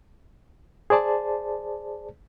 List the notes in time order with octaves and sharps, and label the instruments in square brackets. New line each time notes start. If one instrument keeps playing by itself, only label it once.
[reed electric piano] G#4 C5 D5 A5